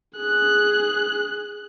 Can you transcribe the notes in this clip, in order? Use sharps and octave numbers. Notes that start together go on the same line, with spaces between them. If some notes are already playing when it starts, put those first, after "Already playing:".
G#4 F#6